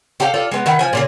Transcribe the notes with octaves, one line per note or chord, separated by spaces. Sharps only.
G4 A4 F5 G5
F4 A4 D5
G#3 B3
D#3 E4 F#5 G5
F3 G#5
A#2 C#3 G#4